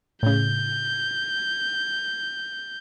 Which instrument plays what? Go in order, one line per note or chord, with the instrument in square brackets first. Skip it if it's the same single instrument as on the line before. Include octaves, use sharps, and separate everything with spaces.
[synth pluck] A2 C#3 [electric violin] G6